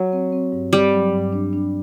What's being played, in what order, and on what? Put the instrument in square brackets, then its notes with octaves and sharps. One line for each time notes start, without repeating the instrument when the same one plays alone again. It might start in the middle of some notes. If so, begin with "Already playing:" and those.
Already playing: [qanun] F#3
[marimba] C4
C4
G2
[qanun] G3 [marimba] C4
[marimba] F#3
G2
D4
D4